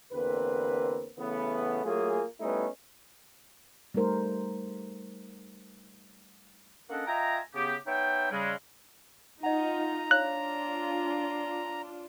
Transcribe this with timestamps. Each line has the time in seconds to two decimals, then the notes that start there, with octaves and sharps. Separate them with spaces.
0.13 E2 D3 A#3 C4 B4
1.19 C#3 E3 A3 B3
1.84 F#3 A3 A#3 F4 G#4
2.40 G3 A3 B3 C#4 D#4 E4
3.94 G3 A3 D#4 A#4 C5
6.90 A#3 C#4 D4 A4 D#5 F#5
7.06 F4 D#5 E5 G5 G#5 A#5
7.54 C#3 B3 G4
7.87 B3 D#4 C#5 E5 G5
8.31 C#3 G3 G#3
9.43 D#4 F4 D#5 F#5 A#5
10.11 D4 F4 C#5 F5 F#6